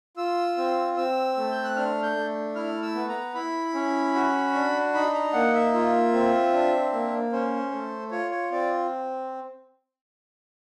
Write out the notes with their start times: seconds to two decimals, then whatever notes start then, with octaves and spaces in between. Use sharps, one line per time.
0.17 F4 E6
0.57 C4
0.97 C4 E6
1.37 A3
1.52 G6
1.64 F#6
1.76 D4 F6
2.03 G6
2.16 A3
2.56 E4 F6
2.82 E6
2.95 B3
3.09 A#5
3.35 E4 B5
3.74 C#4
4.15 F#4
4.54 D4
4.94 D#4 B5
5.14 A#5
5.33 A#3 F#5
5.54 E5
5.74 F4
6.13 C4
6.53 D4
6.93 A#3
7.32 C#4 C5
7.71 A3
8.11 F4 C#5
8.31 C#5
8.51 C4 D5